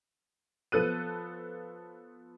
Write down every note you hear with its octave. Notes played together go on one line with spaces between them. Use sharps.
F3 B3 A4 F#6 D#7